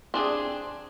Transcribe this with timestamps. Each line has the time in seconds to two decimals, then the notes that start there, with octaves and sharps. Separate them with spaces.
0.14 C4 D4 G#4